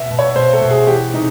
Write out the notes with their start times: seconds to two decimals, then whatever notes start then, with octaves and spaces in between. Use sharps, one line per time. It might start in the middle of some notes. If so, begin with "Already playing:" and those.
Already playing: B2 E5
0.10 B2
0.19 C#5
0.35 B2 C5
0.53 A4
0.61 B2
0.70 G#4
0.87 E3 G4
1.13 C3 D#4